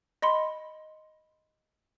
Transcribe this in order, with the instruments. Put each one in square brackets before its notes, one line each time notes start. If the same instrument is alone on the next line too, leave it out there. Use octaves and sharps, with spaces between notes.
[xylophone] D#5 B5 C6